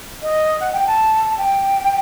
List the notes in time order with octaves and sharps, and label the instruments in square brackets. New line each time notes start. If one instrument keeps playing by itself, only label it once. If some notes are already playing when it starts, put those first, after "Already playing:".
[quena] D#5
F#5
G5
A5
A5
G5